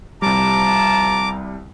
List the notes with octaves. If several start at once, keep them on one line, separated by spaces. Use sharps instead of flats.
C2 C3 F3 G3 A5 A#5 D6